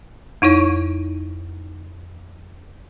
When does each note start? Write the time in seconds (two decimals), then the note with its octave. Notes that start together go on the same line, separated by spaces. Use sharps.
0.42 F2 D#4 E4 C#5